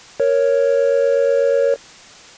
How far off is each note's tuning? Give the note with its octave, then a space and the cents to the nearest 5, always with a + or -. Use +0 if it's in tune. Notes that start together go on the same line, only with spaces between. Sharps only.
A#4 +0 C#5 +0